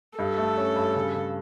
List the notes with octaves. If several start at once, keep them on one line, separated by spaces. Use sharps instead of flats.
G2 A4
A3
C#4
G2
C#3
C#3